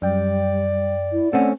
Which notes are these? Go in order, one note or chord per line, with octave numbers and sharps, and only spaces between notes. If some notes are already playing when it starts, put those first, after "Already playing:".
F#2 G3 D5 G5
E4
A3 C4 C#4 F#5